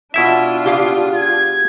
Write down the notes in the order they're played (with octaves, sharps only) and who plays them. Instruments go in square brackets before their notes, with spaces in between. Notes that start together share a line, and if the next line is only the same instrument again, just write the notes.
[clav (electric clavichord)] B2 E4 E5 [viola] D4 F4
[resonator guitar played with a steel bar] G4 G#4 F5
[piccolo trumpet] G#6